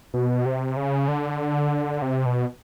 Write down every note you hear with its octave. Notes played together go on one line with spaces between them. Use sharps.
B2
C3
C#3
D3
C3
B2